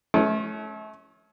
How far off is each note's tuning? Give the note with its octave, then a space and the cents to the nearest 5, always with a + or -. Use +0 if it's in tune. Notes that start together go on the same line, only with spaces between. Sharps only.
A3 -35 C#4 +0